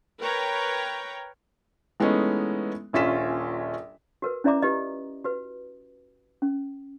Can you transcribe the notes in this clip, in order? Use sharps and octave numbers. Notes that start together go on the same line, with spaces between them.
A#4 B4 C#5 G5 A#5
E3 G#3 A3 B3 C#4 D#4
D#1 A#1 C#4 F4 B6 E7
F#4 A#4 B4
C#4 E4 D5 E5 A#5 D6
E4 F4 G4 B4 D#5
F#4 B4
C#4